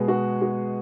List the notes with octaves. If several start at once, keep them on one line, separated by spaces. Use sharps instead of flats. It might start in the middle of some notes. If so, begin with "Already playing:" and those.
Already playing: B2 G#3 B3 G#4
F#4
F#4